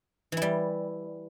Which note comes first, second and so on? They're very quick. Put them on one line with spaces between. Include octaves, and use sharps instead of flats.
E3 E4 G3